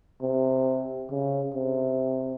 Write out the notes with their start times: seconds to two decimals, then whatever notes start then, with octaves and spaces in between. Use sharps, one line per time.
0.22 C3
1.11 C#3
1.54 C3